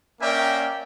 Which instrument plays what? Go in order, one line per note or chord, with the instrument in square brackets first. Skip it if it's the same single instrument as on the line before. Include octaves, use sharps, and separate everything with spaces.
[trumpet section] A#3 C#4 A#4 D5 E5 G5